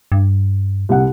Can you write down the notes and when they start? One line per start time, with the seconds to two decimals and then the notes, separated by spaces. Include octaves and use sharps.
0.12 G2
0.89 C2 F#5